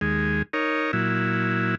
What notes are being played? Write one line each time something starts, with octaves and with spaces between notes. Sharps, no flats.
D#2 G#3
D#4 A#4 C#5
A#2 F#3 E4